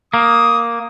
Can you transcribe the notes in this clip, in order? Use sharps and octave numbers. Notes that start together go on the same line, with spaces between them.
A#3 D#6